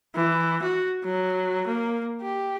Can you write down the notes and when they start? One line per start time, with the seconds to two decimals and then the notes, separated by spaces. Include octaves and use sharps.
0.15 E3
0.62 F#4
1.04 F#3
1.67 A#3
2.22 G4